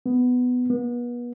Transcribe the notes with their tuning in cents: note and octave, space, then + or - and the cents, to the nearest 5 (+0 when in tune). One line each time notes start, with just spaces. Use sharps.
B3 +10
B3 -35